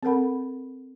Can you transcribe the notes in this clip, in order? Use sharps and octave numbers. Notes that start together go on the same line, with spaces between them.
C4 A4 A#4 F#5 B5